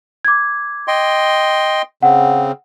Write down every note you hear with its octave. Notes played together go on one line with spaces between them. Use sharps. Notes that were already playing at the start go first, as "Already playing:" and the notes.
D6 G#6
D#5 G5 C6
C#3 C4 F#5